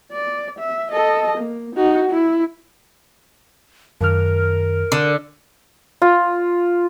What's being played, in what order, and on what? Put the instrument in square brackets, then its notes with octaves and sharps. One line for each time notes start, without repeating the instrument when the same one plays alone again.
[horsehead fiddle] D5
E5
A4 D#5
A#3
D#4 F#4
E4
[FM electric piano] F#2 D#3 F6 [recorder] A#4
[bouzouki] D3
[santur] F4